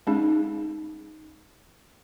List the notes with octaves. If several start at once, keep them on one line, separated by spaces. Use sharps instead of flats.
G#3 C#4 D#4 G#4